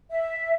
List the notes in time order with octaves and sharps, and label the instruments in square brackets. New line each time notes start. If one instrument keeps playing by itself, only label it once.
[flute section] E5